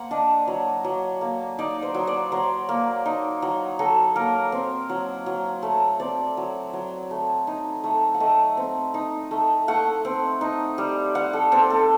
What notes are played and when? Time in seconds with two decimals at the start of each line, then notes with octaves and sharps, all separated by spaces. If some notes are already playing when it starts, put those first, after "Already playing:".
Already playing: A#3 C5 F#5
0.11 D4 D#5
0.48 F#3
0.84 F#3
1.21 A#3
1.59 D#4 D5
1.82 C5
1.94 F#3
2.07 D5
2.32 F#3 C5
2.69 A#3
3.06 D#4
3.42 F#3
3.79 F#3 A4
4.16 A#3 A#4
4.52 C4
4.89 F#3
5.26 F#3
5.63 A3
6.00 C4 D5
6.37 F#3
6.73 F#3
7.11 A3
7.47 D#4
7.84 A3
8.14 F#5
8.20 A3 D#5
8.57 C4
8.94 D#4
9.31 A3
9.68 A3 F#5
10.05 C4
10.41 D#4
10.78 G3
11.15 G3 F#5
11.33 A4
11.52 C4 A4
11.70 A4